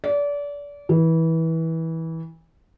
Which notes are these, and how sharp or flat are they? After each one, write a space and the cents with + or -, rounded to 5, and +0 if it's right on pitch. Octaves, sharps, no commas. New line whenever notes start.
D5 -30
E3 -20